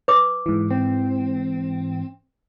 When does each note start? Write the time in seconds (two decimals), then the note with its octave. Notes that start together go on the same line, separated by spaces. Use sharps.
0.08 B4 D6
0.46 G#2 E3
0.71 C4